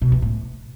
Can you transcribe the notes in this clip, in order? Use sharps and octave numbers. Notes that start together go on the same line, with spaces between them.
B2
E3
A2